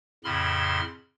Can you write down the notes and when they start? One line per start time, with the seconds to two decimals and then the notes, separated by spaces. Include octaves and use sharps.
0.24 F2 A2 C#3 B5 C6 F6